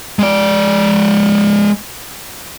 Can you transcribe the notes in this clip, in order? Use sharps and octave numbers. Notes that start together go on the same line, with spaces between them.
G#3 D5